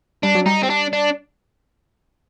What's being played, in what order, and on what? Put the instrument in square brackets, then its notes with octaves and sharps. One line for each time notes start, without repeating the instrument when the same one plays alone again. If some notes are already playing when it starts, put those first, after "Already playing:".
[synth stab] G3 [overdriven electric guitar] D4
[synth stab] F#3
[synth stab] G3 [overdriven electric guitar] D#4
[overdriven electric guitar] C4
D4
D4